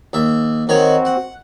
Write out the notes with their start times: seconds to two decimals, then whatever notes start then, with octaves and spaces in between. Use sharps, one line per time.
0.13 D#2 E5
0.69 D#3 C4 F#4 C#5 A#5
1.05 F#5